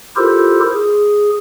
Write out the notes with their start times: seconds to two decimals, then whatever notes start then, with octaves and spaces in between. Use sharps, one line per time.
0.16 E4 F4 G4 A4 A#4 C5
0.73 G#4